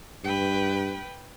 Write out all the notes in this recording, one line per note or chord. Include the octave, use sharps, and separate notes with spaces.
G2 B4 G5